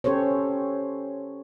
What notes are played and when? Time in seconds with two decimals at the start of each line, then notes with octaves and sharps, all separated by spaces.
0.04 C#4 G4 A4 C5 C#5